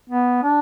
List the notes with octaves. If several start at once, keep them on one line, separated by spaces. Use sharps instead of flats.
B3
D4